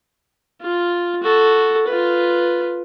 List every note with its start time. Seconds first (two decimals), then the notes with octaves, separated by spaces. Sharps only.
0.61 F4
1.23 F#4 A4
1.88 F4 B4